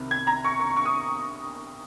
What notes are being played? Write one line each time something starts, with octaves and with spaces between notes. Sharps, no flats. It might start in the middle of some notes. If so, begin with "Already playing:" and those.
Already playing: C2 C3 D#3
G#6
A#5
C#6
C#6
C#6
D#6